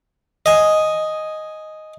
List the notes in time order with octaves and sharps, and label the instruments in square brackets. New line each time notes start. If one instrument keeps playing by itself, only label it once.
[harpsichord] D#5 G#5